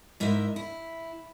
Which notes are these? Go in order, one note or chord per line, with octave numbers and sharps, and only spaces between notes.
G#2 E4 A#4 D#5 E5
E4